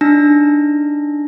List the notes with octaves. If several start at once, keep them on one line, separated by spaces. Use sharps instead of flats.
D4 D#4 A#6